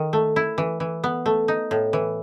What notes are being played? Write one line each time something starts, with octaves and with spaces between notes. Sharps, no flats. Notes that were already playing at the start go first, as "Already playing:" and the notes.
Already playing: D#3
A3
E4
E3
E3
B3
A3
D#4
A2
E3